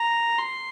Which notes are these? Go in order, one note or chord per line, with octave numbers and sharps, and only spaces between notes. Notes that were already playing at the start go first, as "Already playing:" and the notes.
Already playing: A#5
C6